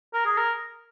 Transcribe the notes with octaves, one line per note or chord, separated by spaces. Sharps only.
A#4
G#4
A#4